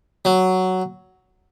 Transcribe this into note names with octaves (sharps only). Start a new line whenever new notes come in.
F#3